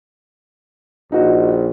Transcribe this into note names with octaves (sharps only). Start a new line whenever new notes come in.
A#1 D#4 F#4